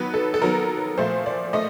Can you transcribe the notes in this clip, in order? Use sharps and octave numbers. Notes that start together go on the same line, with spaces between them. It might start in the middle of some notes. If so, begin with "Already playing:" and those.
Already playing: D#3 F#3 B3 B4
A4
A4
D#3 F#3 B3 A#4
A#2 F3 A3 C5
D5
A3 D#5